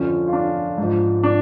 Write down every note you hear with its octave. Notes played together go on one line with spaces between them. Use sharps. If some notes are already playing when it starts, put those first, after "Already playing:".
Already playing: F2 D3 F3 C#4
F4
D4
G#2 F3
D4